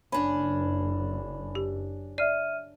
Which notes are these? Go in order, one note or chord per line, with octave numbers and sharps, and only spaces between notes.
F#1 C#4 D4 B5
G4
D5 E5 F6 D#7